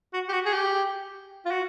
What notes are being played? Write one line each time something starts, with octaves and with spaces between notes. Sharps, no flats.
F#4
G4
F#4
G#4
G4
F4
F#4